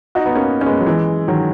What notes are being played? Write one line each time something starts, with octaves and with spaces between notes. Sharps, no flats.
D#4 F#4
B3 D#4
A#3 C#4
C#4
G#3 B3
F#3
E3 G#3
D#3 F#3